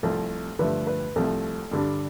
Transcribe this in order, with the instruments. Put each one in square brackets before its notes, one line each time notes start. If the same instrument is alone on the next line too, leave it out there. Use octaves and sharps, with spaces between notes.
[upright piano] C2 C3 F3 A3 [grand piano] A4
[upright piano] G2 D3 F3 A3 [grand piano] B4
[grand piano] B4
[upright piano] C2 C3 F3 A3 [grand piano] A4
[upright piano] G2 D3 G3 D4